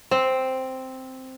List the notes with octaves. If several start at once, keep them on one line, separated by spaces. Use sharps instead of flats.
C4